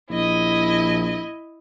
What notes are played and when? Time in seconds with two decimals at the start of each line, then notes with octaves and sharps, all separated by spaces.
0.10 A#1 E4 D#5